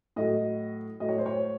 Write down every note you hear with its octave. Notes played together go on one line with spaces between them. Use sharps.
A2 F#3 D#5
A2 F#3 D#5
C#5
C5
C#5